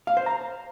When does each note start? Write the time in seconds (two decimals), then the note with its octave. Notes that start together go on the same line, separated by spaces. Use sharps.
0.07 F5
0.17 C5
0.26 A#5